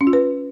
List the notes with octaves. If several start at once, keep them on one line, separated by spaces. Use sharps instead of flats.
C#4
F4
B4